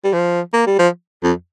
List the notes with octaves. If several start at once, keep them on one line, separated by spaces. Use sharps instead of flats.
G3
F3
A#3
G3
F3
F2